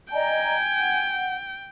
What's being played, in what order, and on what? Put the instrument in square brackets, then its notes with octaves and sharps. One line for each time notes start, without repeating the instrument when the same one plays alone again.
[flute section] D5 D#5 A#5 [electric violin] G5 [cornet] G#5
[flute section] F#5